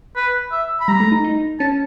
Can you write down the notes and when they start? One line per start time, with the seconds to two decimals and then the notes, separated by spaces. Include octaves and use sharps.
0.16 B4
0.52 E5
0.80 B5
0.88 G3 A#5
1.00 A3
1.12 D#4
1.24 D#4
1.60 C#4 A5